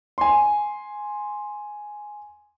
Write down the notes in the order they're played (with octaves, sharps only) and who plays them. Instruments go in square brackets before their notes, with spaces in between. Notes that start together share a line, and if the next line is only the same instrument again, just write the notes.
[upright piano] G#5 C6